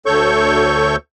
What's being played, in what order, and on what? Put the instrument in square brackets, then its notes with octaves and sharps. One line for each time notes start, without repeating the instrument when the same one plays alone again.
[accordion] D2 A4 C#5 C#6 G6